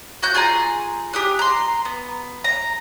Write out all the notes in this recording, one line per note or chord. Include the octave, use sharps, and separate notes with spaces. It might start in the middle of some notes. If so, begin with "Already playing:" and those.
F#4 F#6 G6
F4 G#4 G#5 A#5
G4 D#6 F#6
A#5 C6
B3
A#5